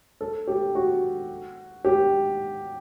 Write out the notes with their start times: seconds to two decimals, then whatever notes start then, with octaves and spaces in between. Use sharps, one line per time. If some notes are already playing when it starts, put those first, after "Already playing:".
0.21 A4
0.47 G4
0.75 F#4
1.85 G4